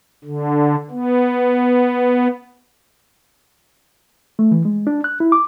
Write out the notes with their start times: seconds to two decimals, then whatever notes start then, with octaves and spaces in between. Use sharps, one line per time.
0.25 D3
0.90 B3
4.39 A3
4.51 E3
4.65 G#3
4.87 D4
5.04 F#6
5.20 E4
5.32 D6